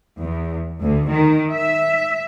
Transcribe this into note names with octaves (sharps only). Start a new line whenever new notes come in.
E2
D2
D#3
E5